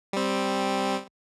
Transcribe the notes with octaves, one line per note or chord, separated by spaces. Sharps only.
G3 C4